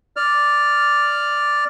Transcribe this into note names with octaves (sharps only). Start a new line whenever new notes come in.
D5 F6